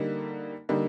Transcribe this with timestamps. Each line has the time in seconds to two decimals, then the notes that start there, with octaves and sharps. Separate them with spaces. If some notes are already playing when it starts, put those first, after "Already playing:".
Already playing: D3 G3 A#3 D#4
0.69 D3 G3 A#3 D#4